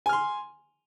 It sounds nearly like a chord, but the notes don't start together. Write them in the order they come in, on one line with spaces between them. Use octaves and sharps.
G#5 F6 C6